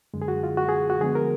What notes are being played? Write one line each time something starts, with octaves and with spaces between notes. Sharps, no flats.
F#2 D3 G#3
G#4
F#4
F4
F#4
G#4
F#4
D3 F3 G#3 B3 G#4
A#4